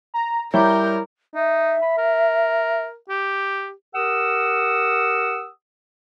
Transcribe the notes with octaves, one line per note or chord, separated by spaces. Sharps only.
A#5
G3 E4 A#4 C#5 E5 A#5 D6 G6
D#4 E5
B5
A#4
G4
G4 A#4 F#5 D#6 E6